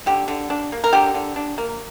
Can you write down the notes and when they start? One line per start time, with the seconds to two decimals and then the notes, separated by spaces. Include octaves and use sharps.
0.06 D3 G4
0.28 D3
0.50 D4
0.72 A#3
0.84 A#4
0.93 D3 G4
1.14 D3
1.36 D4
1.58 A#3